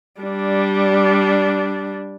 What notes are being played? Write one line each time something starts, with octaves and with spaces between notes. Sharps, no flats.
G3 D4